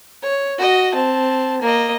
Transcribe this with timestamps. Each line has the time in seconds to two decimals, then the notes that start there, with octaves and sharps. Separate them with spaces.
0.23 C#5
0.58 F#4 D#5
0.94 C4 A5
1.61 A#3 D#5